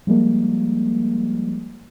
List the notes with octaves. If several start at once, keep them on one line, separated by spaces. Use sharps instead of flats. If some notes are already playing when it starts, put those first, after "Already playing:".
F3 G3 G#3 A#3